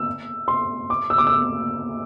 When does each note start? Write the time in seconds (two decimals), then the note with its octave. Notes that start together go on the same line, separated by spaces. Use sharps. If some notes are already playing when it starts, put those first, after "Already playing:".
Already playing: E6
0.48 C6
0.90 D6
1.10 E6
1.18 D6
1.27 E6